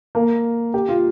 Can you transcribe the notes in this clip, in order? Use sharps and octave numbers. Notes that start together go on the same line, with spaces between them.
A#3
G4
F4